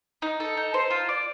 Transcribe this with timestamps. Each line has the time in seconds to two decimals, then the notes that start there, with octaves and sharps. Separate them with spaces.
0.22 D#4
0.40 A4
0.57 D#4
0.74 C5
0.90 F4
1.09 D5